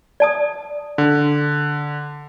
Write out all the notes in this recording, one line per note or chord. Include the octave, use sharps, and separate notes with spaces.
D5 A5 D#6
D3